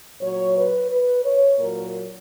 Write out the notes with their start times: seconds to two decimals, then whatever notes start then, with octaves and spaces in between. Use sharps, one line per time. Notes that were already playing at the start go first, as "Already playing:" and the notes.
0.21 A#2 F#3 C#5
0.55 B4
0.89 B4
1.24 C#5
1.57 A#2 F#3 A#4